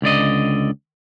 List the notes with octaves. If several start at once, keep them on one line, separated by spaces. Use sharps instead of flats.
C#2 D3 D5 D#5